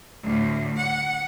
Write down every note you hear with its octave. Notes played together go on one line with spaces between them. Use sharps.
D2 A2
F#5